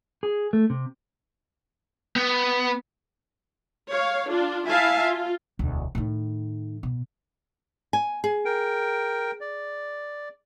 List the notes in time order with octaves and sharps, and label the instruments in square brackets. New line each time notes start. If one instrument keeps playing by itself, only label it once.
[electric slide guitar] G#4
A3
C3
[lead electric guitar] B3
[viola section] C#5 F5
D4 F4
E4 E5 F5 G#5 A5
F4
[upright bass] E1 D2
A2 D#3
B2
[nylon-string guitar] G#5
G#4
[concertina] A#4 G5
D5